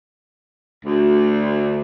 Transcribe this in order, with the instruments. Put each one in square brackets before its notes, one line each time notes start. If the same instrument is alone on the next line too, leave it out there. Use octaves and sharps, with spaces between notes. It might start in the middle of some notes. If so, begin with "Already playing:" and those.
[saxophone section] D2